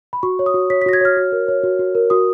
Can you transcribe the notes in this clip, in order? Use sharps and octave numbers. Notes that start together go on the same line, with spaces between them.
B5
F#4 C#6
C#5
D#6
F#4
C#5 B6
B6
F#4 A#6
G#6
C#5 F6
F#4
A#4
C#5
F#4
F#4
A#4
F#4 D#6